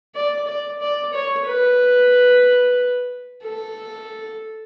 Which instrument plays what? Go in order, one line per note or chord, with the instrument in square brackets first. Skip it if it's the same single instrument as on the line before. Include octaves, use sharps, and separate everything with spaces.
[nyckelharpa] D5
D5
D5
C#5
B4
A4